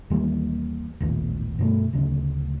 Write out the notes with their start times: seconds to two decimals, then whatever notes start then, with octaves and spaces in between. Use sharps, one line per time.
0.10 D#2 E3 G3 A#3
1.01 A1 D#2 A#2
1.59 G2 B2 A3
1.93 D1 D2 C#3